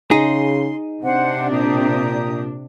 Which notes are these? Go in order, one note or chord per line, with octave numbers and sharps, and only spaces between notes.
C#3 D#4 G#4 C6
C3 C4 D4 C5 F#5
A#2 G4 A#5 D#6